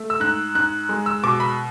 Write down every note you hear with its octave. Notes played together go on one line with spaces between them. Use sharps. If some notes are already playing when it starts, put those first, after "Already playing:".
Already playing: A3
E6
G#2 F#6
G#2 F#6
G#3
E6
B2 D6
B5